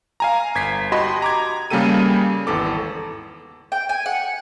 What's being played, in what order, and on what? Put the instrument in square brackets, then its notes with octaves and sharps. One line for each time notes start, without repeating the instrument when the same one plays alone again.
[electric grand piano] F5 G#5 A#5
G1 G#6 B6 C7
F#4 G4 D#5 A5 B5 C6
A#5 D6 G#6
C#3 G3 A#3 G4 A4 D#7
G#1 E2 A4 D6
[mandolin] G5
G#5
F#5